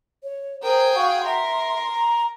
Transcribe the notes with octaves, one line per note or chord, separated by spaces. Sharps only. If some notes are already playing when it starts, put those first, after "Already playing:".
C#5
G#4 A#4 C5 G5
F#4 F5 C#6
A#4 E5 C6
A#5